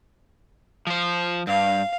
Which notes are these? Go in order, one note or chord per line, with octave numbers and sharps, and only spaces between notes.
F3 C5
G2 F5